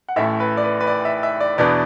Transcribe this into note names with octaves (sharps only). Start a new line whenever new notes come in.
F#5
A1 A2 A3 E4 E5
B4
D5
B4
B4
D5
E5
E5
D5
E2 B2 B3 D4 D5